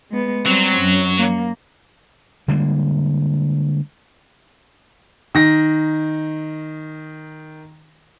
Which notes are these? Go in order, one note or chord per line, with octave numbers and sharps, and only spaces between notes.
G#3 B3
F#3 G3 C4
F#2
A#3
D3 G3 G#3 A#3
D#3 A#6